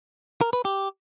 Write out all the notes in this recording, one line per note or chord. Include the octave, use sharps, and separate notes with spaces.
A#4
B4
G4